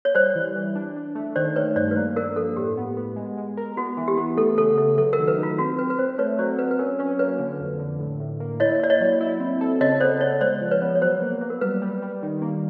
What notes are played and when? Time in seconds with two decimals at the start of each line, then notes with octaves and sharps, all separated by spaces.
0.05 C#5
0.15 G3 C5 D5
0.35 E3
0.56 E3
0.75 D4
0.96 D4
1.15 A3
1.36 D#3 C5 D5
1.56 D#3 B4 C#5
1.76 G2 C5 D5
1.91 B4
1.96 A#3 C5
2.16 D4 A#4
2.36 F3 A4
2.56 A2 G4
2.77 B3
2.97 B3
3.16 G#3
3.38 G#3
3.57 A#4
3.77 B3 F#4
3.97 E3
4.08 G4
4.17 B3
4.37 A3 A4
4.57 C#3 A4
4.77 A3 A4
4.98 F#3 A4
5.13 A#4
5.18 D#3
5.28 B4
5.38 D#4 F4
5.58 C4 F#4
5.78 C4 B4
5.90 B4
5.99 C4 C5
6.18 A3 B4 C#5
6.39 F#3 C5 D5
6.59 F#3 B4
6.71 B4
6.79 C#4 A#4
6.99 C#4 B4
7.19 A#3 B4 C#5
7.39 D3
7.60 F2
7.79 D3
7.99 A2
8.20 A2
8.40 A#3
8.60 E4 C#5 D#5
8.80 E4 D5
8.90 C#5 D#5
9.01 F#3
9.21 E4
9.40 C4
9.61 A4
9.80 C#3 C#5 D#5
10.00 B3 C5 D5
10.20 B3 C#5 D#5
10.41 G#3 C5 D5
10.61 F3
10.71 B4 C#5
10.82 B3
10.95 C#5
11.01 F#3 C5
11.22 A#3
11.41 A#3
11.50 A#4
11.61 G3 B4
11.82 G3
12.02 G3
12.23 D#3
12.42 A#3